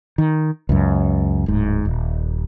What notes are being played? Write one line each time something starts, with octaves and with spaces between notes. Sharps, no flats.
D#3
C#2 F#2
D1 G#2
D#1